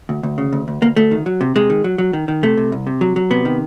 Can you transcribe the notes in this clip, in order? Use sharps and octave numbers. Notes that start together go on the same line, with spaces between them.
D2
D2
C#3
D2
D2
D2 A#3
D2 A3
D#3
F#3
C3
C3 G#3
D#3
F#3
F#3
D#3
D#3
C3 A3
C3
C2
C3
F#3
F#3
C3 B3
D#3